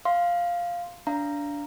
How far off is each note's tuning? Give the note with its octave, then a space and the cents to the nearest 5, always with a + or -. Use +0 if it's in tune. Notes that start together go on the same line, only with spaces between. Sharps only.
F5 +0 C6 +0
D4 -15 F5 -25 A#5 +0